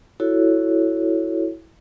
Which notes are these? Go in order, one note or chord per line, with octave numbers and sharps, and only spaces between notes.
E4 F#4 A4 C#5